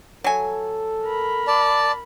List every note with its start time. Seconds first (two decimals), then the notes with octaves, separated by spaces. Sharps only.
0.24 F#3 A4 G#5
1.04 A#4 B5
1.47 D5 A5